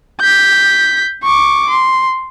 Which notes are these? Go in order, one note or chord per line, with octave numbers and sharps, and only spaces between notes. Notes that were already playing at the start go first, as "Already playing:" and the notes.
G6 B6
C#6 D6
C6